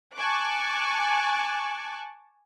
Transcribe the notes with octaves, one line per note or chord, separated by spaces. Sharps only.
G#5 A5 C#6 D6 F#6